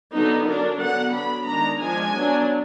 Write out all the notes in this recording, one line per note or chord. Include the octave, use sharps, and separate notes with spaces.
D3 F#3 B3 D#4
F#3 D4 A#4
D3 F#3 B3 D4 F#5
F#3 B3 D4 B5
D#3 G#3 D4 A#5
F3 G#3 D4 G#5
F#3 B3 D4